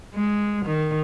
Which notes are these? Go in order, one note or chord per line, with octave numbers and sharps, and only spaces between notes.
G#3
D#3